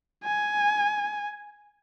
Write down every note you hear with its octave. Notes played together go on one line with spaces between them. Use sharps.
G#5